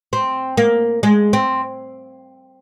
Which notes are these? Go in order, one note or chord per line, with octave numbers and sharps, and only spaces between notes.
C4
A#3
G#3
C4